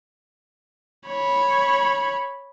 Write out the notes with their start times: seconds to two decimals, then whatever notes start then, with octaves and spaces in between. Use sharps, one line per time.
1.07 C#5 B5